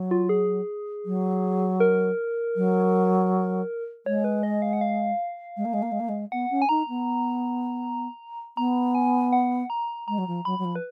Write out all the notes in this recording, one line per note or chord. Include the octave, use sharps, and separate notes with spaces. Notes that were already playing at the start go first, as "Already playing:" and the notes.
Already playing: F#3
F4
G#4
F#3
A#4
F#3
G#3 C#5
B4
D#5
F5
F#5
F5
G#3
A#3
G#3
A#3
G#3
A#3
G#3
B3 F#5
C#4
G#5
D#4 A#5
B3
B3 A#5
G#5
F#5
A#5
G#3 A#5
F#3
F3
F#3 B5
F#3
F3
B4